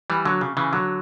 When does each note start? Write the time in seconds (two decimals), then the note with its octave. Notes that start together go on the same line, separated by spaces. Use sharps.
0.10 E3 G3
0.25 D3 F#3
0.41 C#3
0.57 C#3 E3
0.73 D3 F#3